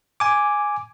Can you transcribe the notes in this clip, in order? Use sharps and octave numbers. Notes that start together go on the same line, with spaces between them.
G#5 D6